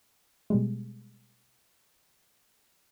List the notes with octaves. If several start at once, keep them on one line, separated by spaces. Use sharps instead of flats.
B2 G3 G#3